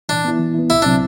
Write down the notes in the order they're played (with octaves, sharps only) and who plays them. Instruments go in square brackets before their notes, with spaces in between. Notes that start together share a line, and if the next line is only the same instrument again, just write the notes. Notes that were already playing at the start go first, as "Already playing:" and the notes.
[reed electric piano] E3 [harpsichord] D4
[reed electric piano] B3 E4
E3
B3 E4
[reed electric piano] C2 [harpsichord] E4
[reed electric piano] C3 F#3 C4 E4 [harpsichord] D4